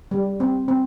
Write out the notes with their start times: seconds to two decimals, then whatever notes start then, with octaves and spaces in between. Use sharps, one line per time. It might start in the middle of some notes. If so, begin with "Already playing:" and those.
0.11 G3
0.40 C4
0.68 C4